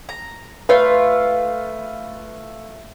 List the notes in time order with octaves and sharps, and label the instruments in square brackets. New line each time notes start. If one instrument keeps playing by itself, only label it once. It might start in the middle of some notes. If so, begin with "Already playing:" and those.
[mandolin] A#5
[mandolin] A3 F4 F5 [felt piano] B4